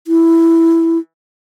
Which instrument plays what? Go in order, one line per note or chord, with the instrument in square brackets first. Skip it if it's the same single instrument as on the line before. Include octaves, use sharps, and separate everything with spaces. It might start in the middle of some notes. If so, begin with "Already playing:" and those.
[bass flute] E4